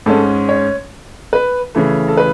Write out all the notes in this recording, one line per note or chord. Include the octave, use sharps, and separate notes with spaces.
G#2 G#3 C#4 A4
C#5
B4
C#3 E3 A3
A4
B4